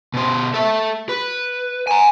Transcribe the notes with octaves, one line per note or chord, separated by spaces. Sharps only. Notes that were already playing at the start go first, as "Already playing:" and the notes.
B2 C5
A4 E5
B4
G#5 A#5